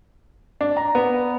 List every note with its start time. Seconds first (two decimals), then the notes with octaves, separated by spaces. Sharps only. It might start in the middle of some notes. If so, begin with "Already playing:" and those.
0.61 D4
0.77 A#5
0.95 B3